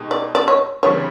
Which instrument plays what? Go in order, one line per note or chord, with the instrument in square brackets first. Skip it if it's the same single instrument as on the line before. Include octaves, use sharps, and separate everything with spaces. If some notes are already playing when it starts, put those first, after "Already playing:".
Already playing: [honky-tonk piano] B2 G#3 D#4 G4
[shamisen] D5
D5
C#5
[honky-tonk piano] D2 C#3 E3 G3 C4 [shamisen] C#5